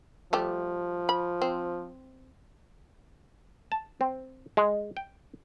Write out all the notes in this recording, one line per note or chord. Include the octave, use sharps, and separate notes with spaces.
F3 G3 A3 G4
B5
C4
A5
C4
G#3
G5